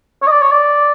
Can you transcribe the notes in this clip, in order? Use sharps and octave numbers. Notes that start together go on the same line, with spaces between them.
C#5
D#5
D5
C#5
D5